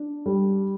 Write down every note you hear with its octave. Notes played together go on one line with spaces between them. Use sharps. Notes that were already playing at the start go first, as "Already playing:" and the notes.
Already playing: D4
G3